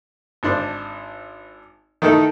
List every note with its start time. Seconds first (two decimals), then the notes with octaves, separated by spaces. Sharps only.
0.43 G#1 D4 C5
2.02 D#3 A3 D#4 A4